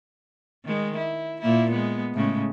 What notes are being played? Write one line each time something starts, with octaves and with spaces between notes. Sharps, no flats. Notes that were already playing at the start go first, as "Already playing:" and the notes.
D#3 G#3
E4
A#2 A#3 E4
G#3 B3
A2 C#3 G#3